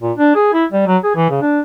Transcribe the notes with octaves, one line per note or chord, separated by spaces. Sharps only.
A#2
D4
G#4
E4
G3
F#3
G#4
E3
C#3
D4